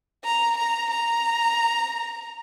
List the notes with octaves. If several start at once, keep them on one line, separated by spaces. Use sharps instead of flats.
A#5
A#5
A#5